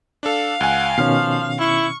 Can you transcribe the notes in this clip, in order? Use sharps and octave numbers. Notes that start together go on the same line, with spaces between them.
D4 A4 F5
C#2 F#5 G#5
B2 D#3 F3 C#4 F6 C7
E4 C#6